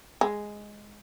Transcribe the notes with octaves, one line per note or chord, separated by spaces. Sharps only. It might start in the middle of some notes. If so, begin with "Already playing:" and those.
G#3